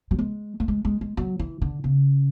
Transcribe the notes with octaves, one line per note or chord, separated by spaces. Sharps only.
F#3
G#3
A3
G#3
G#3
G#3
F#3
E3
D3
C#3